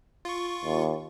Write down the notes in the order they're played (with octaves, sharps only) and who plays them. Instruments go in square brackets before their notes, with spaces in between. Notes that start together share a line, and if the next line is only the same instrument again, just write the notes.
[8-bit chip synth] F4 C#6
[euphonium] D#2